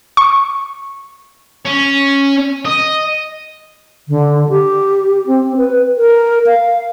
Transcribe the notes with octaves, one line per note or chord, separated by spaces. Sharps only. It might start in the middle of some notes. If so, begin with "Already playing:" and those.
C#6
C#4
D#5
D3
G4
C4
B4
A#4
F5